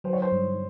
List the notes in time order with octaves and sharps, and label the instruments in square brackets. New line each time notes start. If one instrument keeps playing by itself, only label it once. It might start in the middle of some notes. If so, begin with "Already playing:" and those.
[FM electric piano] F#3 [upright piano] C5
[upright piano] C#5
C5
[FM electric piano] G2